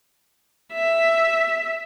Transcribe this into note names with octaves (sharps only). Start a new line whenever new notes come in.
E5